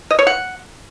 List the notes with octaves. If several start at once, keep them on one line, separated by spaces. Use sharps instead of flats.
D#5
C#5
F#5